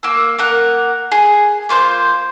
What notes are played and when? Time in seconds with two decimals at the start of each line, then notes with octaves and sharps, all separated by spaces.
0.03 A#3 E6
0.38 A#3 A#4 F#5
1.12 G#4
1.69 A#3 F4 C5 G6